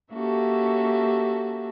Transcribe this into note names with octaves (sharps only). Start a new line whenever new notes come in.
A#3 C#4 F#4 G4 A4 E5